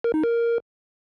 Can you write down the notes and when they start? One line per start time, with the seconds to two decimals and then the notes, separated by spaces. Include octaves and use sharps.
0.04 A#4
0.14 D#4
0.24 A#4